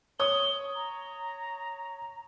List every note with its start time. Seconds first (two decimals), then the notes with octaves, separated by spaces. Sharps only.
0.20 C#5 D#6 G7
0.75 A#5